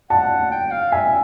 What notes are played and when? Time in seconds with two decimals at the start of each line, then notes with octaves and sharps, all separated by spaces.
0.10 F#5 A5
0.51 G5
0.72 F5
0.92 E5 G#5